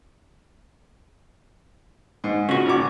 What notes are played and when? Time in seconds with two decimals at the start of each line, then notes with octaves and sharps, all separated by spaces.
2.24 G#2
2.49 A#2 C#3 F#4
2.66 G#1 D6